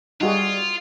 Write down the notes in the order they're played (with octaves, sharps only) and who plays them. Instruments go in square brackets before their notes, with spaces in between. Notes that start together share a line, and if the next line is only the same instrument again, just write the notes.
[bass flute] G3 [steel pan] D#4 F#4 G#4 [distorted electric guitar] F4